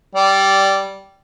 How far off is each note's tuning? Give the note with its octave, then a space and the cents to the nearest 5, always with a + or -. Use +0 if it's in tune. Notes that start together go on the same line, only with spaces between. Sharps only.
G3 -10 D5 -15